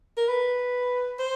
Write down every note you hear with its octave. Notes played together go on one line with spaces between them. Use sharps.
A#4
B4
C5